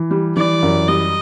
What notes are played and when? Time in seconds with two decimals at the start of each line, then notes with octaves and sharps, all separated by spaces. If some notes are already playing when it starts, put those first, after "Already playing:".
Already playing: E3
0.11 G3
0.37 E3 D5
0.62 F#2
0.88 G3 D#5